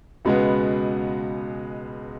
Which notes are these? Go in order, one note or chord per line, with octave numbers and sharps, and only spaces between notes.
C#2 B2 G#3 B3